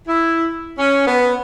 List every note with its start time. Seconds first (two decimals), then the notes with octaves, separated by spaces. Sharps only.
0.08 E4
0.79 C#4
1.07 B3